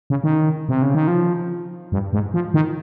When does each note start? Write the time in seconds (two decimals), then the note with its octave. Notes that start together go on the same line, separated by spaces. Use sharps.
0.10 C#3
0.24 D#3
0.69 C3
0.82 C#3
0.95 D#3
1.08 F3
1.92 G2
2.13 G#2
2.34 F3
2.54 D#3